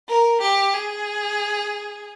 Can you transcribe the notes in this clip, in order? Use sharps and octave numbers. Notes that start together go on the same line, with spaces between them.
A#4
G4
G#4